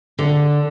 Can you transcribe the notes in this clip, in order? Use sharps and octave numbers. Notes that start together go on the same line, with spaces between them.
D3